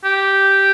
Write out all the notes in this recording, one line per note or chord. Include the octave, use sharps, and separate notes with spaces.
G4